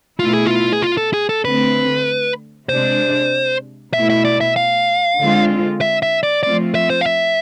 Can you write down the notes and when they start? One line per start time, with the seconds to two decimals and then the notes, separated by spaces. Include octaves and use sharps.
0.19 B2 A3 E4 F4
0.33 G#4
0.46 F4
0.73 G#4
0.82 F4
0.97 A4
1.14 G#4
1.29 A4
1.44 D3 A3 C4 B4
2.69 C3 G#3 D4 C5
3.94 B2 A3 E4 E5
4.10 E5
4.25 D5
4.41 E5
4.56 F5
5.19 D3 G#3 C4 F4
5.81 E5
6.03 E5
6.23 D5
6.43 F3 A3 C4 F4 D5
6.75 E5
6.90 C5
7.01 F5
7.06 E5